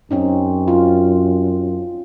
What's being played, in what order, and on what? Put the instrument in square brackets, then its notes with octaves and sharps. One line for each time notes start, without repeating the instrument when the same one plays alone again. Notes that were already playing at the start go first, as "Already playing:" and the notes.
[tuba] F#2 [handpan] C4 C#4 D#4
[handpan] F4